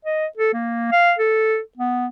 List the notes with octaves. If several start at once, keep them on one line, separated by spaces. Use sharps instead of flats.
D#5
A4
A#3
F5
A4
B3